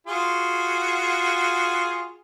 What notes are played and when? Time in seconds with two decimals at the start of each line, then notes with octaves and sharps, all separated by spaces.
0.07 F4 F#4 G#4